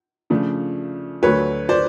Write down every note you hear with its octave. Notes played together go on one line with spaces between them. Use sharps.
C#3 F3 A3 D4
D2 D3 F#3 A3 B4 C#5
C5 D5